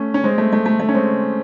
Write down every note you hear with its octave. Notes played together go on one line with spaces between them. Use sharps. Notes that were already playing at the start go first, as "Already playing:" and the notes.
Already playing: A3 C#4
C#4
G#3 C4
A3
A3
A3
A3
C#4
G#3 C4